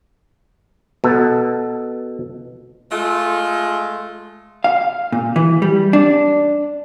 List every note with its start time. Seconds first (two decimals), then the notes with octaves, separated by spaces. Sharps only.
1.04 B2 A4
2.91 G#3 A3 F4
4.64 F5
5.12 A#2
5.36 E3
5.62 G3
5.93 D4